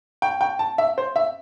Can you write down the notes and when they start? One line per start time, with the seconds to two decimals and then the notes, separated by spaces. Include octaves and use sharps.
0.22 G5
0.41 G5
0.59 A5
0.78 E5
0.98 C5
1.16 E5